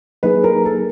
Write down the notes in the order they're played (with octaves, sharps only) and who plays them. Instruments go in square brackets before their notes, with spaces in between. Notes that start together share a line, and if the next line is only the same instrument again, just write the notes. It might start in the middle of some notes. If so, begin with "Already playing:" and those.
[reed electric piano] F#3 A#3 D#4 G#4 [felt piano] B4
[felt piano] A#4
A4